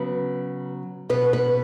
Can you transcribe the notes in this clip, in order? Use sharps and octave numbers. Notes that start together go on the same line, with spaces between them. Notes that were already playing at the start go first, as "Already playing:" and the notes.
Already playing: C#3 F#3 B3 B4
B2 B3 B4
B4